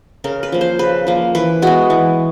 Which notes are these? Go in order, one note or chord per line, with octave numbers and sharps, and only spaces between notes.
C#3 A#4
B4
F3 A#3
C5
C#3 B4
F3 A#3
E3 B4
G#3 B3 F#4
E3